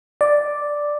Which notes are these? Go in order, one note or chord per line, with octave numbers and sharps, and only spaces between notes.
D5